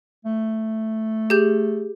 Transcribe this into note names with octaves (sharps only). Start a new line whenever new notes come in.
A3
G4 G#4 G6